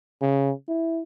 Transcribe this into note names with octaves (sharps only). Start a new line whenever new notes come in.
C#3
E4